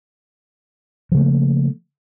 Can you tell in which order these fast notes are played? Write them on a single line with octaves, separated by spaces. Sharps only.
F3 C#3 A3 A#3